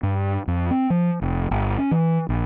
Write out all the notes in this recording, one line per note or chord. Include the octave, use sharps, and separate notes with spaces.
G2
F2
C4
F3
F1
G1
C#4
E3
A#1